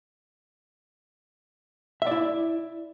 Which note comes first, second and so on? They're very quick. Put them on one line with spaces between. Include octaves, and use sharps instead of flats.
E5 D5 E4